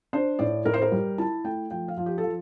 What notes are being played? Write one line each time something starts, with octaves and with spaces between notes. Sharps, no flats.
D4 C5
A2 D5
A2 A#4
C5
A#4
G3
E4 A5
A3 G5
F3 G5
F5
F3
G4
A4
F3